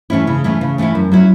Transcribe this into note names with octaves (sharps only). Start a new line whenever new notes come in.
E3 A3 C#4 E4
C#3
E3 A3 C#4 E4
C#3
E3 A3 C#4 E4
F#2
F#3 C#4 E4